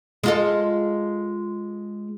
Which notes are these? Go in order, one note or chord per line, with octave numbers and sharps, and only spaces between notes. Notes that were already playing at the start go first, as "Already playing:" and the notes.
G#3 F4 A4